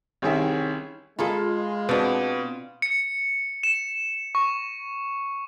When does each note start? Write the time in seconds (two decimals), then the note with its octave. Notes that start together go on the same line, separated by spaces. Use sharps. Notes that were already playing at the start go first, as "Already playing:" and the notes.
0.22 C2 D#3 C#4 G#4 E5
1.19 G#3 A#3 F4 G#4 A4 B5
1.89 B2 B3 C4 D4
2.82 C#7
3.63 E7
4.35 C#6